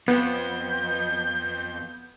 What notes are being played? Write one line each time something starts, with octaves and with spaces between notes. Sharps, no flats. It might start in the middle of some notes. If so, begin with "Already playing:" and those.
F2 B3 G6